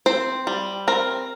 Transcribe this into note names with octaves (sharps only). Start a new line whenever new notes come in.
C4 C5
G3
C4 A#4